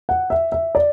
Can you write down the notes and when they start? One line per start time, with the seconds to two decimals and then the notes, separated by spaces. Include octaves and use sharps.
0.09 F#5
0.30 E5
0.52 E5
0.75 D5